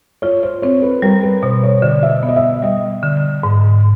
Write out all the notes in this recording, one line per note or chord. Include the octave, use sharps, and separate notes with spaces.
F4 C#5
C5
C4 C#5
B4
G3 A#4
B4
B2 C5
C#5
D3 D5
E5
D#5
B3
D#5
E5
G3 D#5
D3
G#2